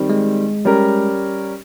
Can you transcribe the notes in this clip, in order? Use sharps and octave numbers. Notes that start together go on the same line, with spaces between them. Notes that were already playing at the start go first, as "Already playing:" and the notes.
Already playing: D#3 G3 C4
G#3
G3 C#4 G4 A#4